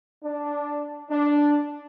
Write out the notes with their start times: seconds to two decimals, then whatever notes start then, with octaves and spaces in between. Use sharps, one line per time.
0.24 D4
1.09 D4